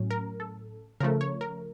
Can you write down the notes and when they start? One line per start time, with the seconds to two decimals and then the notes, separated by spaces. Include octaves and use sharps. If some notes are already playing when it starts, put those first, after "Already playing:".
Already playing: A2 F#3 C#4
0.10 A#4
0.40 A4
1.00 C#3 F3 A3 A#4
1.21 C#5
1.41 A#4